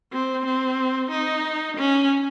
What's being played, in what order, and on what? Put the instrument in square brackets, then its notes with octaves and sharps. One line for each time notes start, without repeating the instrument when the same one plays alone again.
[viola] C4
C4
D#4
C#4